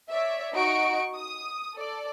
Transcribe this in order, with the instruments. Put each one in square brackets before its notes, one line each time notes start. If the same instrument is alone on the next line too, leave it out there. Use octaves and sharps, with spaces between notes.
[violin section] C#5 D5 E5
D#4 F#4 D#5 F#5 C#6 D7
D#6
A4 D5